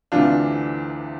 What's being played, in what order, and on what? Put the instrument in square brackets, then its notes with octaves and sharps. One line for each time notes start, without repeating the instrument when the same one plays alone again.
[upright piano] D2 C3 E3 D4 F4